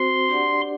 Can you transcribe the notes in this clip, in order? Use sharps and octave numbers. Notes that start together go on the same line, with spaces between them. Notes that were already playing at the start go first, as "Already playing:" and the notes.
Already playing: C4 F#4 C5 C6
D4 G4 D5 F#5